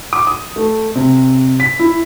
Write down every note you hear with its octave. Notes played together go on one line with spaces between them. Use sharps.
D6
D#6
A3
C3
B6
E4